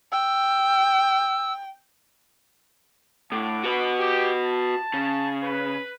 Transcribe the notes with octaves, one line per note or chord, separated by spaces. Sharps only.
G5 E6
A2 D4 F#5 D6
F#4 B4
G4
A5
C#3
B4